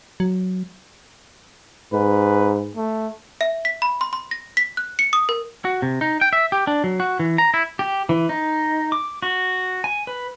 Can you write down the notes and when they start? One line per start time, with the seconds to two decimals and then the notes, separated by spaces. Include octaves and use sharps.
0.20 F#3
1.93 G#2 B4
2.75 A3
3.41 E5
3.65 B6
3.82 B5
4.01 C6
4.13 C6
4.31 A#6
4.57 B6
4.77 F#6
4.99 C#7
5.13 D#6
5.29 A#4
5.65 F#4
5.82 C3
6.01 D#4
6.21 G5
6.33 E5
6.52 G4
6.67 D4
6.84 F#3
7.00 F#4
7.20 E3
7.38 A#5
7.54 E4
7.79 G4
8.09 E3
8.29 D#4
8.92 D6
9.23 F#4
9.84 G#5
10.07 B4